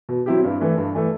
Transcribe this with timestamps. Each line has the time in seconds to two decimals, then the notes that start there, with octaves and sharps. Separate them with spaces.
0.09 B2
0.26 F#3 C4 E4 G4
0.44 G2
0.61 E3 A3
0.77 G2
0.95 E3 A3